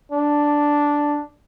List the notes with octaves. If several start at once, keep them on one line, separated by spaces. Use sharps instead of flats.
D4